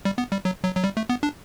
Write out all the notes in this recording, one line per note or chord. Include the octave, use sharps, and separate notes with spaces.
G3
B3
G3
F#3
F#3
F#3
G3
A3
B3
D4